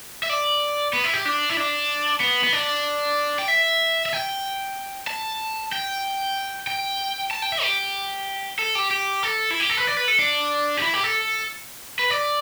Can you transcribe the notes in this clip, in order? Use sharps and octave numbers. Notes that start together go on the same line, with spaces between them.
E5
D5
B3
E4
G4
D4
E4
D4
B3
B3
D4
G5
E5
E5
G5
A5
G5
G5
A5
G5
E5
G4
A4
G4
G4
A4
E4
G4
A4
B4
D5
B4
A4
D4
G4
E4
G4
A4
B4
D5